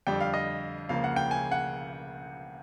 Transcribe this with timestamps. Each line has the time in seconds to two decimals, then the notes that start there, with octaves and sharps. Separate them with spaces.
0.07 F2 D3 G3 G5
0.21 F5
0.34 D#5
0.89 C#2 C#3 F3 A#3 F5
1.04 F#5
1.16 G5
1.31 G#5
1.52 F#5